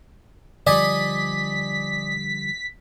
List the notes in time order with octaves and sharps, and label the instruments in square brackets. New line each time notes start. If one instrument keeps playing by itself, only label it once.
[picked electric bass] D3 F3 G3 [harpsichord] D5 D#5 G#5 [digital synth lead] B6